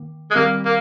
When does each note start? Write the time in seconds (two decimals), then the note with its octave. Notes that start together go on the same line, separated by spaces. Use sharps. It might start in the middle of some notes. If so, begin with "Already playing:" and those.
Already playing: D#3 A#3
0.31 G#3
0.35 D#3 G3 A#3 C4 G4
0.66 A#3